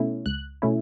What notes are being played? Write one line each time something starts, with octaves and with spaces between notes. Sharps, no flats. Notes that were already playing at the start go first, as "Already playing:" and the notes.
Already playing: B2 A3 C#4 E4
C#2 F#6
B2 A3 C#4 E4